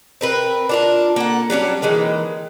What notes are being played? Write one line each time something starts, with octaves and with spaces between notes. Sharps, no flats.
C4 A#4 B4
D4 F4 A#4
A#3 A4 F#5
F#3 G3 C#4 D4
D#3 E3 G#3 A#3